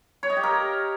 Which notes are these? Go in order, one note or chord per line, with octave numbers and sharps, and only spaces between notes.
C#5
D#5
G4
A#4